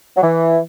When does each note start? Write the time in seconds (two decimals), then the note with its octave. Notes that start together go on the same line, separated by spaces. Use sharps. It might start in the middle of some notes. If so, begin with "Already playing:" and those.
0.17 F#3
0.22 E3